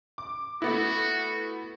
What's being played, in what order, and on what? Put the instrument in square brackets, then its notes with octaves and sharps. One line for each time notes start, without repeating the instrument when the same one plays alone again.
[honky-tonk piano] D6
[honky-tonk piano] A3 B3 E4 [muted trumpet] F#4